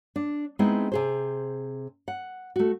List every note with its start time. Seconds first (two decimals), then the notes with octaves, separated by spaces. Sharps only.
0.16 D4
0.59 G#3 B3 C4 D#4 E4 G#4
0.92 C3 G#4 C5
2.08 F#5
2.56 A3 F#4